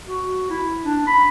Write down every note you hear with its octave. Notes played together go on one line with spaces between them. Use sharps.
F#4
E4
D4
B5